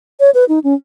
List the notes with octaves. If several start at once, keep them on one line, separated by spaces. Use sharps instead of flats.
C#5
B4
D#4
C#4